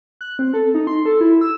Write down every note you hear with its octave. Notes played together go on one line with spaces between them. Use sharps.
F#6
C4
A4
D#4
C6
A4
E4
E6